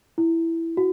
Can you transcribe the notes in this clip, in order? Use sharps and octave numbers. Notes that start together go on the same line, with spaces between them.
E4
F#4